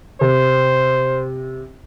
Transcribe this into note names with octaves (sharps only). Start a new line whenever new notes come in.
C3 C5